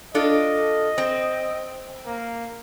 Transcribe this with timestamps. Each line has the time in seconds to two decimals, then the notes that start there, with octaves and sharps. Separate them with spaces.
0.15 D4 F4 A4 D#5
0.98 C4
2.06 A#3